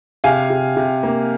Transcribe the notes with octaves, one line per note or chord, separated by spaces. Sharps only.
C3 F5 G#5
C3
C3
A#3